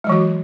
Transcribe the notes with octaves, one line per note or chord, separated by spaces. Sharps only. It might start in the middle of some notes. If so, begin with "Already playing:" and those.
E3 F#3 G#3 F#4